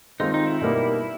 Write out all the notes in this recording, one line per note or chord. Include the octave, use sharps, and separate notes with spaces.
D#3 G#3 C4 D#4 F4
D#4
E4
B2 G3 A#3 D#4